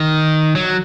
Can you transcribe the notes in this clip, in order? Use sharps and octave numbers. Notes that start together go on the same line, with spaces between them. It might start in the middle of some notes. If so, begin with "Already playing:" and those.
Already playing: D#3
F#3